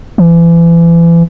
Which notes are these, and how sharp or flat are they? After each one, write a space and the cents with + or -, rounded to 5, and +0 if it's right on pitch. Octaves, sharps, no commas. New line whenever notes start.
E3 +35